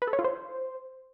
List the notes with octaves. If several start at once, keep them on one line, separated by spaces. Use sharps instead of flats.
B4
A4
C#5
F4
C5